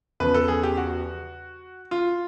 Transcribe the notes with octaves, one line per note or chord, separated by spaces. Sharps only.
E2 C#3 F3 B4
A4
G#4
G4
F#4
F4